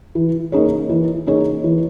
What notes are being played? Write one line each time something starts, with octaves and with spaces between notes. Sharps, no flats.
E3
A#3 D#4 G#4 C#5
E3
A#3 D#4 G#4 C#5
E3